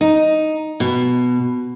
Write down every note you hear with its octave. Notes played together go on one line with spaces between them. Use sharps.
D#4
B2